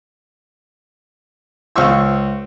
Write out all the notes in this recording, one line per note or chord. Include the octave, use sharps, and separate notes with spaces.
C#2 C5 F5 C#6 E6